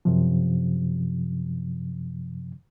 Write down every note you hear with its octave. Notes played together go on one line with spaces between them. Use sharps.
F#2 C3 F3